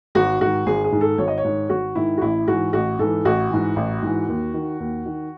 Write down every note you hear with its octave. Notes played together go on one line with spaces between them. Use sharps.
G#1 F#4
G#2 D#3 F#4
G#1 G#4
G#4
G#2 D#3
A4
G#1 C#5
D#5
C#5
G#2 D#3
G#1 F#4
G#2 D#3 E4
F#4
A1 E4
G#2 E3 F#4
A1 F#4
G#2 E3 A4
A1 F#4
G#2 E3
A1
G#2 E3
D#2
D#3
D#2
D#3